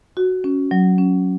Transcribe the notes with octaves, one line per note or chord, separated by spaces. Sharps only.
F#4
C#4
F#3
C#4